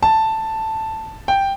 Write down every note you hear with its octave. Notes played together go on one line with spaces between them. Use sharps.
A5
G5